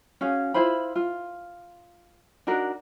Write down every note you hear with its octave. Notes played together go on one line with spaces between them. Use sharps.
C#4 F#4 G#4 F5
E4 F4 C5 B5
F4
D4 D#4 F#4 A#4